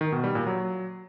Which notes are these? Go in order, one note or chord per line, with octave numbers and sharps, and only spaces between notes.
D#3
B2
G3
A#2
F#3